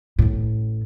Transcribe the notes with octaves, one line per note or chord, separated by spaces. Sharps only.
A1 A2